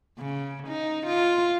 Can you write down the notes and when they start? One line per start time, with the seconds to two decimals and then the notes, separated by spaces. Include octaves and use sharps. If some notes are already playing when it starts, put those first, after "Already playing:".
0.18 C#3
0.68 D#4
1.07 F4